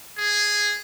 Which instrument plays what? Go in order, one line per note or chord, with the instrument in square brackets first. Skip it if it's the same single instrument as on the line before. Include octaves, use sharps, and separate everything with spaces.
[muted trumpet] G#4